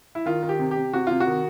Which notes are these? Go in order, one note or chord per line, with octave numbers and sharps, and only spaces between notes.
E4
D#3 F4
D#3
G4
C3
G4
C3
C3 F#4
C3 F4
F#4
D#3